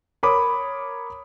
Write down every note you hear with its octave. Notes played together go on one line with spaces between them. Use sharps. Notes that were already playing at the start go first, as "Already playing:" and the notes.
A#4 C#5 B5 D6 D#6